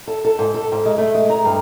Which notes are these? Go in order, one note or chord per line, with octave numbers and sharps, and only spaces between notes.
A4
A4
G#2
A4
G#2
G#3
A3
G#3
A#5
G2